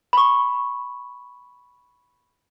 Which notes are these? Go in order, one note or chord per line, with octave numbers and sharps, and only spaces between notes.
B5 C#6